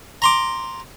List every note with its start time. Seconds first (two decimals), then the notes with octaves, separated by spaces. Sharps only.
0.22 A#5 C6 D6